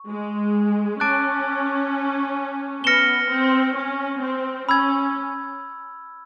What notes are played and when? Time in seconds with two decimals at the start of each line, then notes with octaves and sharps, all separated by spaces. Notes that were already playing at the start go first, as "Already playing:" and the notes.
Already playing: C#6
0.09 G#3
1.00 C#4 A5 D6 F#6 A6 D7
2.84 B3 F6 A#6 C#7 E7 G7
3.30 C4
3.76 C#4
4.22 C4
4.69 C#4 B5 E6 G#6